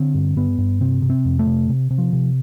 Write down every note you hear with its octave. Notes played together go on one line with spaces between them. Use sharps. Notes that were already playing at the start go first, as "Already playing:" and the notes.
Already playing: D3 C4
G2
G2 B3
G2
C3 C4
C3
C4
F2
A3
C3
C3
C3
F3
C3